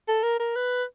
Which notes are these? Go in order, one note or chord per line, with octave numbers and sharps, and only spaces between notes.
A4
A#4
A#4
B4